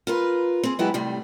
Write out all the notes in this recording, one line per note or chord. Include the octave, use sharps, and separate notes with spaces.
F4 A#4 B4
C4 G#4
E3 F#3 G#3 B3 E4 G4
A2 C3 G3